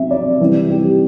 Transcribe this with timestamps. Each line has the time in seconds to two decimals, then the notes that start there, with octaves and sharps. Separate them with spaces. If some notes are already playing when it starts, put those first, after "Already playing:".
Already playing: C3 F#3 C4 E5
0.11 D5
0.41 C3 E3 G3 C4
0.70 G4